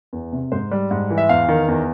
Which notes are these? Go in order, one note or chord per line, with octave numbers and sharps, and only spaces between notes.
E2
C3
G#2 C5
G3
G#2
E3
E5
E2 F5
D#3
E2